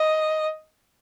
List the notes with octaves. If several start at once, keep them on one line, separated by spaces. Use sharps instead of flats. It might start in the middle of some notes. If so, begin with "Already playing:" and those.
Already playing: D#5